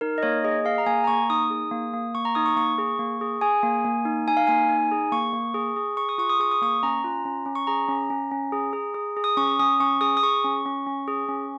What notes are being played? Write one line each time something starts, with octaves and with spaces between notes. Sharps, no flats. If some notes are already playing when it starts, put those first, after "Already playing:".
D#4 A#4
D#5
A#3 C#5
G#4 D#5
G#4 F5
A#5
A#3 G#5
A#5
A#3 C#6
D#4 D#6
G#4
A#3
A#3
A#3 C#6
A#5
D#4 D#6
C#6
A#3 C#6
G#4
A#3
G#4
G#4 G#5
A#3
A#3
D#4
D#4 G#5
F5
A#3 G#5
D#4
G#4
A#3 C#6
A#3
G#4
G#4
G#4 C#6
D#6
F4 C#6
D#6
G#4 C#6
D#6
A#3 C#6
C#4 A#5
F4
C#4
C#4
C#6
G#4 A#5
C#4
C#4
C#4
G#4
G#4
G#4
G#4
D#6
C#4 C#6
C#4 D#6
C#4 C#6
G#4 D#6
D#6
G#4 C#6
C#4
C#4
C#4
G#4
C#4